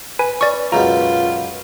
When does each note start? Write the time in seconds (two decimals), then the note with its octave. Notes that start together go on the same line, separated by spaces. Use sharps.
0.19 B4 G#5
0.41 C#4 D5 C#6
0.72 C#2 F#2 B2 F4 A#5